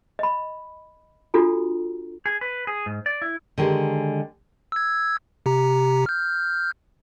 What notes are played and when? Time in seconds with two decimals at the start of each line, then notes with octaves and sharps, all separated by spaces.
0.19 D#5 B5
1.34 D4 F4 F#4 A4 A#5
2.26 G#4
2.41 B4
2.67 G#4
2.86 G#2
3.06 D5
3.22 E4
3.58 D3 D#3 G#3 G4 G#4
4.72 E6 G#6
5.46 C3 G4 A#5
6.06 F6 G6